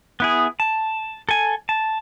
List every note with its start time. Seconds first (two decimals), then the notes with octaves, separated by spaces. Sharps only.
0.20 B3 E4 G#4
0.60 A5
1.29 A4 G#5
1.69 A5